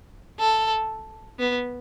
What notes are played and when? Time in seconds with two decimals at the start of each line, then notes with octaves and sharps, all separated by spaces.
0.40 A4
1.39 B3